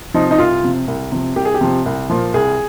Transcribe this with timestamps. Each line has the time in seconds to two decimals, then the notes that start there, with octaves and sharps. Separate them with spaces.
0.14 C3 F3 D#4
0.31 D#4
0.39 C2 F4
0.63 C3 F3
0.88 C2
1.12 C3 F3
1.36 C2 G4
1.45 G#4
1.54 G4
1.61 C3 F3
1.86 C2
2.10 A#2 F3
2.34 C2 G#4